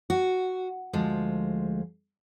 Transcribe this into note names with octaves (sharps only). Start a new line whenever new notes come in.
F#4
D2 F3 G#3